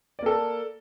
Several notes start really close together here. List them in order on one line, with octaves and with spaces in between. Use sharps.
D5 A#3 A4